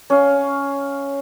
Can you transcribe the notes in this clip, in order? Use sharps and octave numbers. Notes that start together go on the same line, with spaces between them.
C#4 F5